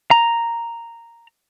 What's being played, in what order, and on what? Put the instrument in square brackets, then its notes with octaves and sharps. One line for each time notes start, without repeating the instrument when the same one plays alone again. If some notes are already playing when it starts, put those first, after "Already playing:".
[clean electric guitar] A#5